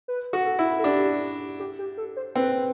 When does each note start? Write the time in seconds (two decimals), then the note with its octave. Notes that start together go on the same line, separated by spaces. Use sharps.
0.08 B4
0.33 F#4
0.46 A4
0.59 E4
0.79 A4
0.84 D4 G4
1.60 G4
1.79 G4
1.97 A4
2.16 C5
2.35 C4 B4